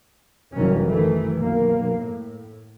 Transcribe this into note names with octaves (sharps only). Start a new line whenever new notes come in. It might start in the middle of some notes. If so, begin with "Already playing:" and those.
F#1 C2 D#3 E3 C#4
D#3 E3 A3
B1 A#3
A2